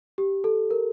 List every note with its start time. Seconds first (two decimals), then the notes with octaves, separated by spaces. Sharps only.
0.18 G4
0.44 A4
0.71 A#4